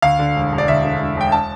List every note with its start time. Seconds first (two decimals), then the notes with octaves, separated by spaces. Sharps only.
0.02 D2 F5
0.19 D3
0.36 E1
0.52 E1
0.58 D5
0.67 D2 E5
0.83 D3
0.99 E1
1.16 E1 G5
1.32 A5